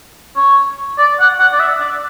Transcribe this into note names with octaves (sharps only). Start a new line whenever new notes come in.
C#5
D5
F#5
F#5
D5
E5
D5